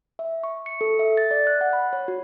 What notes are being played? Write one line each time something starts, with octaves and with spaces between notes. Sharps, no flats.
E5
C#6
C#7
A4
E5
A6
D5
F#6
F#5
B5
C#5
F#4